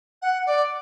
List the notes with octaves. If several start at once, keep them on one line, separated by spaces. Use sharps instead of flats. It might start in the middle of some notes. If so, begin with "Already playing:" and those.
F#5
D5